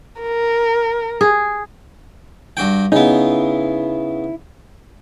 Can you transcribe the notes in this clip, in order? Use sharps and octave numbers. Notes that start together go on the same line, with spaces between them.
A#4
G#4
G2 F#4 G5
C#3 B3 D#4 E4